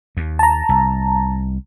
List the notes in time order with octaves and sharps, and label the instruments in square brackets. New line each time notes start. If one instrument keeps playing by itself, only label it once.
[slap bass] D#2
[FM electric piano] A5 A#5
[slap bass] C2